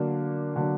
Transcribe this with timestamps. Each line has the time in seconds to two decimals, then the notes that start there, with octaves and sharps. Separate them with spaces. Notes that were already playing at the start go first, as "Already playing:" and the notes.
Already playing: D3 F#3 A#3 D4
0.56 D3 F#3 A#3 D4